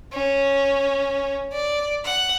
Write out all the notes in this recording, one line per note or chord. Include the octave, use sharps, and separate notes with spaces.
C#4
D5
F#5